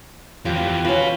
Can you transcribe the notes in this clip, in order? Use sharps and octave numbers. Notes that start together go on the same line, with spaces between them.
F2 E3 F4 G4 D6
C#4 F4 F#4 B4